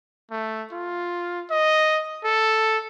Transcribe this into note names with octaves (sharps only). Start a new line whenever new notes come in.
A3
F4
D#5
A4